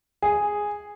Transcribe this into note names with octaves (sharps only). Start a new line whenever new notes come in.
G#4